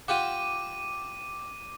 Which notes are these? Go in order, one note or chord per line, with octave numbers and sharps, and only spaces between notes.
F4 G4 F#5 D6 D#7